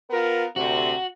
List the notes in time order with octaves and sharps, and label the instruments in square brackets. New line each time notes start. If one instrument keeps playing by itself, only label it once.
[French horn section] B3 F4 A#4
[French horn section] D2 C3 [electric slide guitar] F#4